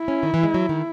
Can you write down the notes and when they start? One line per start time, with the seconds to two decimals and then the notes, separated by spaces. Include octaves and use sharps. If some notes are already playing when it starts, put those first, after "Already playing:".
Already playing: E4
0.08 C#4
0.23 D#3
0.34 E3
0.43 G#3
0.54 F#3
0.69 D#3